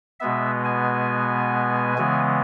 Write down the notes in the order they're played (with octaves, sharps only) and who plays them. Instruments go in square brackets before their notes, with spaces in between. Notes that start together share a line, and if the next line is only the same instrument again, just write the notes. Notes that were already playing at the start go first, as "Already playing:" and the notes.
[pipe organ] B2 G#3 B3 E5
G#5
C#3 E3 G#3 B3